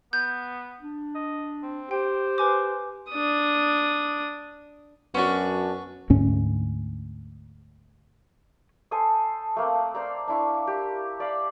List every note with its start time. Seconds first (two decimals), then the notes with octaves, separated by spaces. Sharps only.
0.13 B3 G6
0.81 D4
1.15 D#5
1.63 C4
1.91 G4 C5 G5
2.38 B4 G#5 D6
3.11 D4 D#6
5.15 F#2 B3 C#4 D4 F#4
6.10 D2 G#2 C#4
8.91 A4 C5 G#5 D#6
9.56 A3 A#3 C4
9.94 C5 D5 A#5
10.28 D4 E4 C#6
10.67 G4
11.20 D5 F5 B5